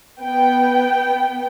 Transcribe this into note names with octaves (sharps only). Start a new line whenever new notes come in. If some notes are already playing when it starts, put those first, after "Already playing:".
B3 G5